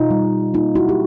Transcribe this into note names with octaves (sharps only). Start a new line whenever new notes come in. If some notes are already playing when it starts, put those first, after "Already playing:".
Already playing: B2 D#4 F4
G3
A#3 D#4 F4
E4 F#4
G4